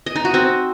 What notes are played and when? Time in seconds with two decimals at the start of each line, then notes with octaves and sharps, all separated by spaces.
0.06 D#5
0.16 D#4
0.25 F#4
0.34 C4